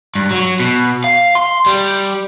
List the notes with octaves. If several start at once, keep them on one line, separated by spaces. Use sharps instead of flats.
G2
F#3
B2
F5
C6
G3